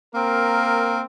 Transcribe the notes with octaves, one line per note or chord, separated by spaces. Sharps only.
A#3 C4 A#4